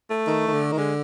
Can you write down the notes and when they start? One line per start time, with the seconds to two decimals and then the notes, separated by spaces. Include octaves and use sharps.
0.10 A3
0.27 D#3
0.48 D#3
0.53 D3
0.72 D#3
0.77 D3 G#3